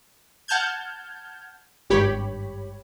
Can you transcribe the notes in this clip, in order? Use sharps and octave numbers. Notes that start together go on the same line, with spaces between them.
F#5 A5 F6 G6 G#6
G#1 G2 G4 C#5 B5